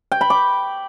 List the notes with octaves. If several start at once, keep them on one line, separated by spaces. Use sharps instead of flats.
G5
B5
D6